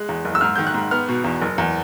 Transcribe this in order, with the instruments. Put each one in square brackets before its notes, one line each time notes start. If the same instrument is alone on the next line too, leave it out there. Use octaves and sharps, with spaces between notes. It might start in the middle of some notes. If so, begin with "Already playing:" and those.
Already playing: [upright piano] G#3 F#6
E2
F#1
E6
G#2 F6
D#3 G6
F#6
G#2
B3 F6
B2
E2
F#1
E2